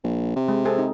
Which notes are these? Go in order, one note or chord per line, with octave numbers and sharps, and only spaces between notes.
A#1
C3
G#3
C4 G#4 A4
D#4